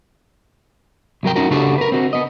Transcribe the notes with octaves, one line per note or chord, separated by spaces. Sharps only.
C2 F#3 A#4 G5
C#4 D#4 F#4 A#4
C#3 D4 F#4 G4 A4
A#4 B4
C4 F#4
B3 D#5